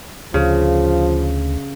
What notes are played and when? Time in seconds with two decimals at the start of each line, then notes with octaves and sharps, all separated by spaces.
0.34 D2 C#3 F3